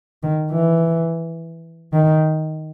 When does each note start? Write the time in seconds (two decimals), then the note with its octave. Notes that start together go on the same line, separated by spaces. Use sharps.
0.23 D#3
0.51 E3
1.93 D#3